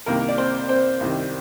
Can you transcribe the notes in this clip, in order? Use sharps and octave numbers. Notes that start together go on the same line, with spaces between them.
C2 C3 D#3 A#3 A#4
D5
C4 C5
C4 C5
C2 C3 D#3